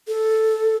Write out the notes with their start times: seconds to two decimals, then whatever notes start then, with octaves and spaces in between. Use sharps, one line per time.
0.08 A4